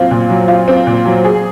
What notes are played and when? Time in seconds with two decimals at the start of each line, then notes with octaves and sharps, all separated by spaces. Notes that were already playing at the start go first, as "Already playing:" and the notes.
Already playing: A#2 F#3 C4 F4
0.11 A#2
0.29 F#3
0.48 F4
0.68 C4
0.87 A#2
1.06 F#3
1.25 G#4